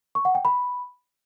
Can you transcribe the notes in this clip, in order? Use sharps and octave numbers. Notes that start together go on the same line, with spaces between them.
C#6
F#5
G5
B5